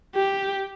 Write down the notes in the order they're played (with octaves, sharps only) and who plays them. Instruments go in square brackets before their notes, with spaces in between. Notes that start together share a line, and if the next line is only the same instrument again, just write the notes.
[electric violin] G4